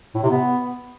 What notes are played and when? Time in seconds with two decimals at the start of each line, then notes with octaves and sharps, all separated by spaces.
0.15 A2
0.23 C3
0.31 B3